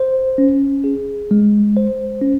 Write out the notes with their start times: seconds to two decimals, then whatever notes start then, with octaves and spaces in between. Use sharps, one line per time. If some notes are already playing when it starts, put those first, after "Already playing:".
Already playing: C5
0.38 C#4
0.84 G#4
1.31 G#3
1.77 C5
2.22 C#4